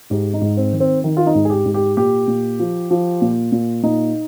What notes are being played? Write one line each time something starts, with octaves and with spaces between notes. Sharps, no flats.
G#2 G4
D#4
G#2
C4
D#3
C4
D#3
F4
D#4
G#2
G#4
G4
G#2
G4
A#2 G4
A#2
F3
F3
A#2
A#2
A#2 D#4